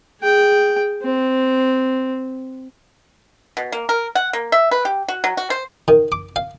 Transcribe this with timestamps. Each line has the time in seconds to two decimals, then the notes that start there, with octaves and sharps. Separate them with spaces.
0.21 G#4 G5
1.02 C4
3.57 B2
3.72 A#3
3.89 A#4
4.15 F#5
4.33 A#3
4.52 E5
4.71 B4
4.85 G4
5.08 F#4
5.24 F#3
5.37 F#4
5.50 C5
5.88 D#3
6.12 D6
6.36 F5